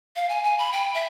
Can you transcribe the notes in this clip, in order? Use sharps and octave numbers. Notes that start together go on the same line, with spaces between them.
F5
G#5
G#5
B5
G5
E5